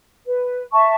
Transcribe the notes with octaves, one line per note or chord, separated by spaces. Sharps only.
B4
E5 A5 C#6